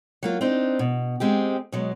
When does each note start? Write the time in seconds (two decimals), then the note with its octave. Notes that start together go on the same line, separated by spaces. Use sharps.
0.23 F#3 A#3 F4
0.41 C4 D4 D#4
0.79 B2
1.20 G#3 C4 G4
1.72 B2 F#3 G#3